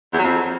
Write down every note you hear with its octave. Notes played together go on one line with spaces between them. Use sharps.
E2
F#3
F2